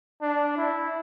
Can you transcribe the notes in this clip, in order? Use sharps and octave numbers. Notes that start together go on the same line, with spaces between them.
D4
E4